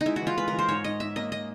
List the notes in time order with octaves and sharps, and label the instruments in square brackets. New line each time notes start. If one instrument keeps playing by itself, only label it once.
[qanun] D#4
[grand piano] G#3 [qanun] E4
[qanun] F#4
[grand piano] E3 [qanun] F4
[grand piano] G#3 [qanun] B4
[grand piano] E3 [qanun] A#4
[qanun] C5
[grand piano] G#2 [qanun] C#5
[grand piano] G#2 [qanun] D#5
[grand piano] G#2 [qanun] E5
[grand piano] A#3 [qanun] D#5
[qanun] D#5